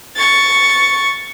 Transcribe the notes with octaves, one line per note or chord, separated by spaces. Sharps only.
C#6 A6